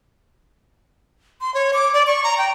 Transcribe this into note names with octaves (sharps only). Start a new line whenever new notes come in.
C6
C#5
D6
D5
C#6
A#5
G5